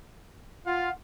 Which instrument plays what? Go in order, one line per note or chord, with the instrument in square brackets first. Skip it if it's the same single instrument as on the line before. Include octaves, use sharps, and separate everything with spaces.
[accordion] F4 [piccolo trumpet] F5 [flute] F#5